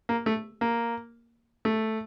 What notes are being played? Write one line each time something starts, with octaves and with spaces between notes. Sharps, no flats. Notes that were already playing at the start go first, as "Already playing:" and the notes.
A#3
A3
A#3
A3